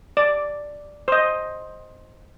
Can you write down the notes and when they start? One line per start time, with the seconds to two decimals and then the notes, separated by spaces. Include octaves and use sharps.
0.17 D5
1.08 C5 D#5